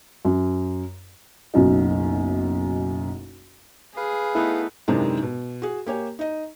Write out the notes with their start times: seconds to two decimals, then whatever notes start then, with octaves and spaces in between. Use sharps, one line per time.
0.25 F#2
1.54 F#1 B1 F#2 D#4
3.97 G#4 B4 F5
4.35 A3 B3 D#4 E4
4.88 F#2 C3 D#3 E3 G#3 D4
5.23 B2
5.62 F#4 G#4
5.87 A#3 G4 C#5 G#5
6.19 D#4 D#5